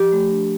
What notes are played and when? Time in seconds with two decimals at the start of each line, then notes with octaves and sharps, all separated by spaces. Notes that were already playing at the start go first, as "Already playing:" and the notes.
Already playing: F3 G4
0.12 A3
0.31 D4